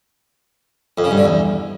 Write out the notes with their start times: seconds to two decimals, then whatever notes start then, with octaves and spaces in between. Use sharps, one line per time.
0.98 F2
1.04 C#3
1.11 G2
1.18 D3
1.24 E2